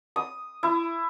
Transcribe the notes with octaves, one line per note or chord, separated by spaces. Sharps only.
D#6
E4